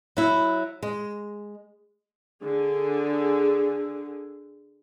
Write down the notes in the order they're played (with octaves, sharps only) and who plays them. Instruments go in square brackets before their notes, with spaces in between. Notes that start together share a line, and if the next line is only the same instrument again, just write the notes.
[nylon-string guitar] F#3 E4
G#3
[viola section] D3 G#4